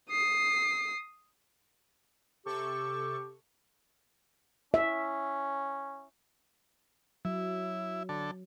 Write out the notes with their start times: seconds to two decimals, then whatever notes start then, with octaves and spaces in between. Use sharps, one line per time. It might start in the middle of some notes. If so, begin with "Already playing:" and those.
0.10 D#6 C7
2.46 C3 G4 A4 C#6
4.74 C#4 E5
7.25 F#3 E4
8.09 D3 A4